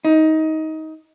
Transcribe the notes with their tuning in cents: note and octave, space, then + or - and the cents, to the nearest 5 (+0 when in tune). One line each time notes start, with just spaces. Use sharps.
D#4 +20